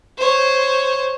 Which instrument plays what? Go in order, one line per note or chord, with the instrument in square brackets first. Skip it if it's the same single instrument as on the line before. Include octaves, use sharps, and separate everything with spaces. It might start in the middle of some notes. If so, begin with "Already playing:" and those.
[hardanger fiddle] C5 C#5